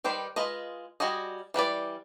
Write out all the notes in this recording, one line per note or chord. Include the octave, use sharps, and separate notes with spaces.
D#3 G3 B4 C5
G#3 F4 B4 D#5
G3 F#4 G#4 D#5
E3 G3 B4 D5